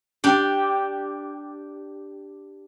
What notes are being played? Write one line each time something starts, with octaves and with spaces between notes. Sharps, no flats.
D4 G4